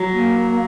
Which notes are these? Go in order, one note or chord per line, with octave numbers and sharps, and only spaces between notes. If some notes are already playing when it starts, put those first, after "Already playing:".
Already playing: F#3
A#3